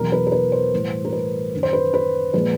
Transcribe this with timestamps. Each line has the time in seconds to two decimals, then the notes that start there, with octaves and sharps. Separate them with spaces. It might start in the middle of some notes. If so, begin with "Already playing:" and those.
Already playing: E2 B2 F#3 A#4
0.12 B4
0.27 A#4
0.32 B4
0.52 C5
0.73 A2 E3 G3
1.05 A#4
1.13 B4
1.53 F#2 D#3 F#3
1.63 C5
1.73 B4
1.94 B4
2.34 A#2 F3 G#3 B4